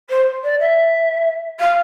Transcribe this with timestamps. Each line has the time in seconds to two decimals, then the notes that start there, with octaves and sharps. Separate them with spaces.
0.09 C5
0.43 D5
0.59 E5
1.59 F5